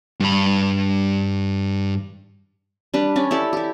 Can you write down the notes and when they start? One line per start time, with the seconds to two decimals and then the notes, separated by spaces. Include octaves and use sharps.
0.20 G2 B5
2.94 G3 D4 B4
3.16 C#4 D5
3.31 E4 G4 A4 D5
3.53 E4 G4